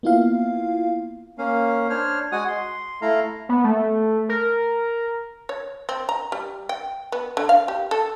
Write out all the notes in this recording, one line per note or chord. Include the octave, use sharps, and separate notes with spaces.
A#3 B3 E4 F4 F5
A#3 C#4 F5
D4 C5 C#5 F6
G#3 F#4 F#5 G#5 D#6
C6
A3 E4 A4 F5 A#5
B3
A3
A#4
C#5
C4
A#5
G3
G5
B3
D3
F5
G4
A4